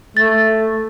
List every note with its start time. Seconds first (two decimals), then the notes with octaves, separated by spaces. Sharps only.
0.17 A3 A6